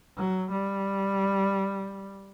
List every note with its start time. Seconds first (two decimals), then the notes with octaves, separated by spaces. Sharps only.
0.17 F#3
0.51 G3